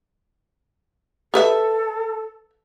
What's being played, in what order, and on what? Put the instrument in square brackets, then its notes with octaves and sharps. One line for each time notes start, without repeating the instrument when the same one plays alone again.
[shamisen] G4 B4 E5 [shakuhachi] A4